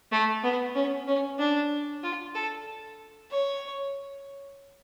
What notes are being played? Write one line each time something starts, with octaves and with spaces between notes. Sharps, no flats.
A3
B3
C#4
C#4
D4
F4
A4
C#5